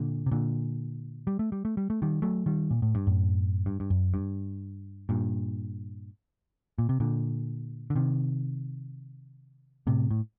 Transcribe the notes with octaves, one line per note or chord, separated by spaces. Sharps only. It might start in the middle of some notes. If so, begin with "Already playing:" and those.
Already playing: A#2 D3
C3
A#2 D3
G3
A3
G3
A3
G3
A3
D#3 G3
F#3 A3
D#3 G3
A#2
A2
G2
F#2 A2
G2
G2
F#2
G2
G2 A#2
A#2
C3
A#2 D3
D3
C3 D#3
A2 C3
A2